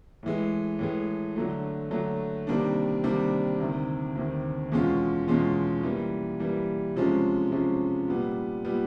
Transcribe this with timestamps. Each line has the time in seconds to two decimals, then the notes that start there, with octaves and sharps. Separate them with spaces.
0.23 A2 E3 G#3
0.79 A2 E3 G#3
1.36 D3 F#3 A3
1.91 D3 F#3 A3
2.47 C3 D#3 G3 A#3 D4
3.03 C3 D#3 G3 A#3 D4
3.60 D2 C3 D#3
4.16 D2 C3 D#3
4.72 E2 B2 G#3 C#4 F4
5.28 E2 B2 G#3 C#4 F4
5.83 E3 G3 A#3
6.40 E3 G3 A#3
6.96 C3 F3 G#3 C#4
7.52 C3 F3 G#3 C#4
8.08 A#2 G3 B3
8.65 A#2 G3 B3